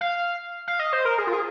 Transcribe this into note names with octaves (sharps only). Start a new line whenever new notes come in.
F5
F5
D#5
C5
A#4
G#4
F4
G#4